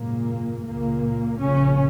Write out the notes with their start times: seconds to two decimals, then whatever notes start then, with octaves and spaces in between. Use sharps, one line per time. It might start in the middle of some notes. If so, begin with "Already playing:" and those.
Already playing: G#1 F#2 A#2 C#3 A#3
0.66 C#2 A#2 C#3 A#3
1.40 A#1 A#2 C#3 C#4